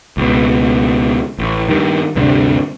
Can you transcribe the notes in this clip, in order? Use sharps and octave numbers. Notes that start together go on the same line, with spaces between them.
C#2 B2
A1
G2 D#3
D2 G2 C3 D4